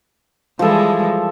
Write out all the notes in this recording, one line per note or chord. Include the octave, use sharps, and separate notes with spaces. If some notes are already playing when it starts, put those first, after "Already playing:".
E3 F3 G3 G#3 A4